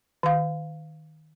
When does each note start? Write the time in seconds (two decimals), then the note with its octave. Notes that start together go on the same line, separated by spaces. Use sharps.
0.23 D#3 F5